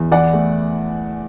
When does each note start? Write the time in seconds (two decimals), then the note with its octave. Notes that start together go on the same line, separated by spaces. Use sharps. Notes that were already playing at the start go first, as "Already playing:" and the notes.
Already playing: E2
0.11 E3 D5 F#5
0.33 A3